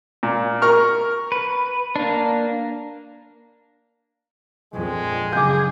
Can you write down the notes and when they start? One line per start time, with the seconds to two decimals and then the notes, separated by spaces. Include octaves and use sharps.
0.23 A#2
0.62 A#4 C#6 F6
1.32 B4
1.96 A#3 D4
4.73 A#1 F2 G#3
5.33 F#1 G#4 D6 G6